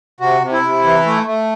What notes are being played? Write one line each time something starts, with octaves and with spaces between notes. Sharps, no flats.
C3 F#4
C3
E4
C3
E3
A3
A3